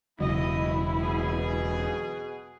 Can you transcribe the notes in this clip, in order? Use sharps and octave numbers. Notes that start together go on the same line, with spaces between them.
E1 C#3 F#3 E4 D#5
B2 G#4